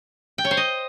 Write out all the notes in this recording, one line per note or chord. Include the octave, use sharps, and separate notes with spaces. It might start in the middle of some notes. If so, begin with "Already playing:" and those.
G5
C#5
C5
D#5